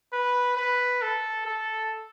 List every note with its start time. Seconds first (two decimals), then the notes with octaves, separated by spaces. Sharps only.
0.13 B4
0.57 B4
1.02 A4
1.46 A4